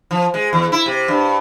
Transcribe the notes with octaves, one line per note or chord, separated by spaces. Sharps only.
F3
G#3
E2
E4
C3
G2